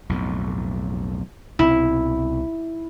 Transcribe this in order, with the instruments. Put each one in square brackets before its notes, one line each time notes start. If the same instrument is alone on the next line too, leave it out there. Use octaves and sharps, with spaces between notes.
[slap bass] B1 F2 A2
[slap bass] C2 B2 C4 [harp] E4